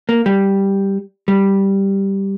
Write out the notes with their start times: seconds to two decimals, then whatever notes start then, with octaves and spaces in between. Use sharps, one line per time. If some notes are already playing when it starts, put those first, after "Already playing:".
0.09 A#3
0.26 G3
1.28 G3